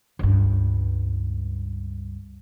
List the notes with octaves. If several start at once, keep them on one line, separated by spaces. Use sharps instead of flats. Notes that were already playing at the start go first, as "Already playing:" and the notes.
C#2 G2